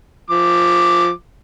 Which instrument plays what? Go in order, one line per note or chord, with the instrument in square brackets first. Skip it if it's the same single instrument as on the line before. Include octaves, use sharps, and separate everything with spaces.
[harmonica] F3 D6